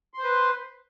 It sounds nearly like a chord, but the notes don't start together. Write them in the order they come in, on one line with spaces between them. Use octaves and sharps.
C6 C5 B4